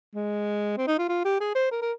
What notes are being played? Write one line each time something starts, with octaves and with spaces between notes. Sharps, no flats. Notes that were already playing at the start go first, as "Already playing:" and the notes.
G#3
C4
D#4
F4
F4
G4
G#4
C5
A#4
A#4